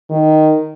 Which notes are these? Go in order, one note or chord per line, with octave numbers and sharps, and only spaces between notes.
D#3